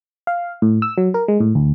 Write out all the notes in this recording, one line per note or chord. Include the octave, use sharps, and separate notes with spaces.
F5
A2
E6
F#3
A#4
G#3
A2
D2